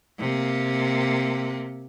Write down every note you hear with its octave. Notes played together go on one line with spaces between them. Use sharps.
C3 A#3